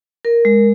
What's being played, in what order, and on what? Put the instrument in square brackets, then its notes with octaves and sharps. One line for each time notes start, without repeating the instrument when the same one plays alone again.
[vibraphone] A#4
G#3